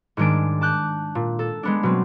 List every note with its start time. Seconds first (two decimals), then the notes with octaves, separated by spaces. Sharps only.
0.17 G#2 D#3 G#3 D4 D7
0.61 A5 D6 F#6 G6
1.15 A#2
1.39 A4
1.63 G#3 B3 D4
1.83 B2 F#3 C4